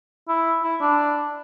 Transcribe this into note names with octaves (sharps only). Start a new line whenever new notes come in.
E4
E4
D4